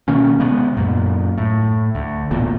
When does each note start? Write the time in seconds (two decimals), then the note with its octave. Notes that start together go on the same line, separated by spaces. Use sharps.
0.08 B2 D#3 A#3 C#4
0.39 C3 G#3 B3
0.77 F#2 A#2
1.38 A2
1.95 D2
2.30 E1 A1 E2 A#2